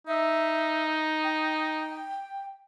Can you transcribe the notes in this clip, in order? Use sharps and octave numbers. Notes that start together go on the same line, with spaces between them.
D#4 E5
G5